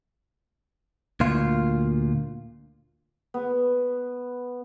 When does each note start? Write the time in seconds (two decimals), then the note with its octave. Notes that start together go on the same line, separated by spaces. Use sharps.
1.20 D2 A#2 F4
3.34 B3